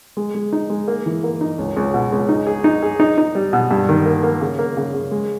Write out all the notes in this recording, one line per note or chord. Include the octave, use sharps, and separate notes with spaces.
G#3
G#3
D#4
G#3
A#3
E3
A#3
D#4
C#2
C#2
B2
C#2
D#4
G#4
D#4
G#4
D#4
D#4
G3
B2
G2
D#3
A#3
A#3
C#3
A#3
C#3
C#3
G#3